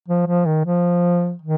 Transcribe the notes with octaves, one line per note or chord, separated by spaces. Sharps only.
F3
F3
D#3
F3
D#3